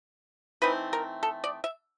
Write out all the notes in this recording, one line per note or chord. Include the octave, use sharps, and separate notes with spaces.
E3 A3 C4 D#4 B4
A#4
A4
D5
E5